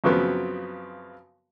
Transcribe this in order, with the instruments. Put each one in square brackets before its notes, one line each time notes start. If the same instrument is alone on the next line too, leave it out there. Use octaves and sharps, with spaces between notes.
[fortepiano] F#2 C#3 F3 F#3 B3 C4